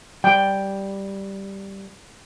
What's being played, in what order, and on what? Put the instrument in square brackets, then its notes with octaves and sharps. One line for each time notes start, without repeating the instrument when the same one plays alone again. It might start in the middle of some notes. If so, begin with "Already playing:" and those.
[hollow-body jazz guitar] G3 [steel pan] G5